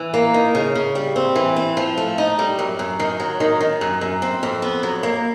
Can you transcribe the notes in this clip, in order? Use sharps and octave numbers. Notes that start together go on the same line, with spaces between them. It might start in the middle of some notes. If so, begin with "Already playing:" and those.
Already playing: E3
A#3
D#3
C#3
C#3
G3
C4
E3
C4
F3
A3
D#4
G3
F#2
F#2
D#3
F#3
D#3
D#3
F#2
F#2
C4
F2
B3
F#3
A#3